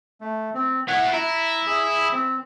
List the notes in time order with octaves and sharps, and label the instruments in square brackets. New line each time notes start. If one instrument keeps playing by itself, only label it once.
[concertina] A3
C4
[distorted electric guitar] E4 C#5 [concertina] F#5
[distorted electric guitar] E4 [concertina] A#5
[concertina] G#4 E5
C4